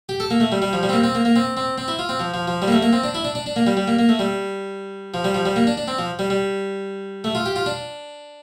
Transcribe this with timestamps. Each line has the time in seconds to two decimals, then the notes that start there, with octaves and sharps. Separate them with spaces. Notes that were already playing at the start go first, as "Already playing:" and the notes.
0.09 G4
0.20 A4
0.30 A#3
0.40 A3
0.52 G3
0.62 G3
0.73 F3
0.83 G3
0.89 C4
0.93 A#3
1.04 C4
1.15 A#3
1.25 A#3
1.36 C4
1.57 C4
1.78 C4
1.88 E4
1.99 F4
2.09 C4
2.19 F3
2.34 F3
2.48 F3
2.62 G3
2.68 A#3
2.72 A3
2.82 A#3
2.93 C4
3.04 D4
3.15 E4
3.25 D4
3.35 D4
3.46 D4
3.56 A#3
3.67 G3
3.77 G3
3.88 A#3
3.99 A#3
4.09 A3
4.19 G3
5.14 F3
5.24 G3
5.34 F3
5.45 G3
5.56 A#3
5.67 D4
5.77 D4
5.88 C4
5.98 F3
6.19 G3
6.30 G3
7.24 A3
7.35 F4
7.46 G4
7.56 F4
7.66 D4